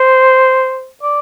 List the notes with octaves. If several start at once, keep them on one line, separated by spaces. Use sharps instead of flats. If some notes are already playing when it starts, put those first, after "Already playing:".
Already playing: C5
D5